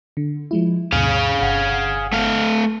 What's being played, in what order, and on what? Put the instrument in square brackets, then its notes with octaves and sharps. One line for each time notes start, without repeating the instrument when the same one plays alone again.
[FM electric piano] D3
F3 G#3 E4
[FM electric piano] D2 G2 B2 [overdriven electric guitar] G#4 F5
[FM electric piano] G1 F#5
[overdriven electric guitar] A3 F5